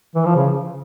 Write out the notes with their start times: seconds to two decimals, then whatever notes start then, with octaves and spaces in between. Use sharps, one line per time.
0.15 E3
0.26 F3
0.36 C#3